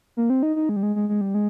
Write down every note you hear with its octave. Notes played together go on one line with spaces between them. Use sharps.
A#3
C4
D#4
D#4
G#3
G3
G#3
G#3
G#3
G3
G#3